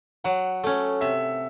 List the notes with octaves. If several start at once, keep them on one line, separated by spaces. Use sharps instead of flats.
F#3 F#5
A3 C#4
C3 E5